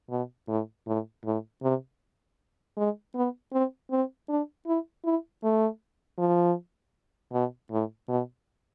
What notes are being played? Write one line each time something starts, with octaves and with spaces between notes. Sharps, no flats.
B2
A2
A2
A2
C3
G#3
B3
C4
C4
D4
E4
E4
A3
F3
B2
A2
B2